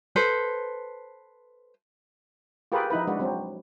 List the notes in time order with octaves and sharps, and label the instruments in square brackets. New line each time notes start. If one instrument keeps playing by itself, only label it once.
[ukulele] A4 B4 C5
[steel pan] F4 G4 G#4 A#4 B4
F3 D#4 E4 B4
G#3 D4 F#4 B4
F#3 C4